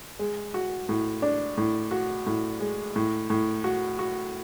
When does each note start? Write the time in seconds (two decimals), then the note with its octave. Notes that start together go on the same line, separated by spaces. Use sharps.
0.19 G#3
0.54 F#4
0.89 A2
1.22 D4
1.57 A2
1.91 F#4
2.26 A2
2.60 G#3
2.96 A2
3.30 A2
3.64 F#4
3.99 F#4